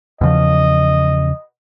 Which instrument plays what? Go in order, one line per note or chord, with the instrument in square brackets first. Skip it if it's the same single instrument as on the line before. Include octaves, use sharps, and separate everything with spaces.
[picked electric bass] E2 C#3 F3 [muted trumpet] D#5